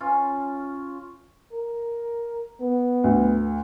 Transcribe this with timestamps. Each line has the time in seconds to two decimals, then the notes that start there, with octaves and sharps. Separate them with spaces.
0.01 C#4 F4
1.53 A#4
2.61 B3
3.04 D2